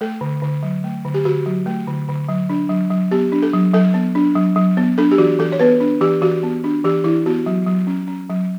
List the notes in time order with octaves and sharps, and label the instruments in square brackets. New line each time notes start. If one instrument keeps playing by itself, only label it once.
[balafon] A3 A4
D3
D3
F#3
A3
D3
G4
D3 F#4
F#3
A3
D3
D3
F#3
D4
F#3
F#3
B3 G4
D4
A4
F#3
F#3 A4
B3
D4
F#3
F#3
B3
D4 A4
G4
E3 F#4
E3 A4
C#5
B3 B4
D4
E3 G4
E3 F#4
B3
D4
E3 G4
E3 E4
B3 F#4
F#3
F#3
C#4
C#4
F#3